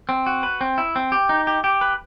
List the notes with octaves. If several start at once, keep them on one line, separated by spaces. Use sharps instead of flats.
C4
F#4
B4
C4
E4
C4
G4
D#4
G4
G4
B4